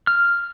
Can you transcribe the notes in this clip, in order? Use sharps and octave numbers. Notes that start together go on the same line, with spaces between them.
F6